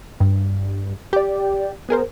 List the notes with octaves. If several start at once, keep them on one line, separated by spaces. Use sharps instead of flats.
G2
G4 D5
B3 G#4 A#4 C5